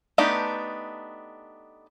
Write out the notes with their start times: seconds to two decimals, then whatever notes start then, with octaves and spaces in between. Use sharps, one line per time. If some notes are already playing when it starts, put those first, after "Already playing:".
0.18 A3 B3 D4 D#4 G4